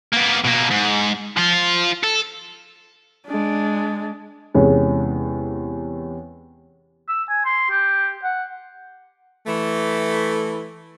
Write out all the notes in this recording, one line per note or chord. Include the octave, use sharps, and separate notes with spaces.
A#3 B3
B2 A#3
G#2
F3 F4
A4
G#3 D4
E2 C3 G#3 C#4
E6
G#5
C6
G4
F#5
E3 A3